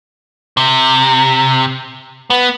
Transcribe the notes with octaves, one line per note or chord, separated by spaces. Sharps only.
C3
B3